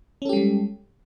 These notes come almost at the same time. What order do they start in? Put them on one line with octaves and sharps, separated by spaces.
C#4 A4 G4 G#3 G3